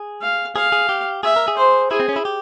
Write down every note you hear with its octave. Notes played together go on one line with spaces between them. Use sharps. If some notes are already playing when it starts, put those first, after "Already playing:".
Already playing: G#4
F5
G#4 F5
G#4
G4
G#4 E5
A#4
G#4
C5
E4 G#4
C4
C#4
E4
G4